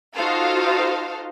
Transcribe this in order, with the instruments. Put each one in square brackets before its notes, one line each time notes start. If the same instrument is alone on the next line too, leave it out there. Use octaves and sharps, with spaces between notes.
[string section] D#4 F4 F#4 A4 C5 F5